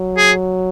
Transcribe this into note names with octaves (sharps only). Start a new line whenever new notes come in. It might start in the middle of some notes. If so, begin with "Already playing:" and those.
Already playing: F#3
G#4